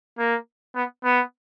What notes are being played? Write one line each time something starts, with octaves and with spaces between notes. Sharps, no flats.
A#3
B3
B3